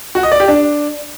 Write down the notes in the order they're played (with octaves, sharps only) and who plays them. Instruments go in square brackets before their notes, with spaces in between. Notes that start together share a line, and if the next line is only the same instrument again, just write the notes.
[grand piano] F#4
D#5
D5
G4
D4